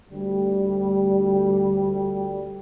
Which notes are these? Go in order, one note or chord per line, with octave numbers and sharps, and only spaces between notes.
D2 G3